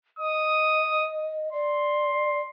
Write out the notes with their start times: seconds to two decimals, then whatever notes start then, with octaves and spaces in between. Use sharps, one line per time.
0.19 D#5 D#6
1.53 D5 C6